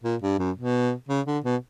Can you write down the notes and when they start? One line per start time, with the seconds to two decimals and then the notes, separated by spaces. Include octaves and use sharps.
0.04 A#2
0.22 G2
0.39 F#2
0.56 B2
1.09 C#3
1.26 D3
1.44 B2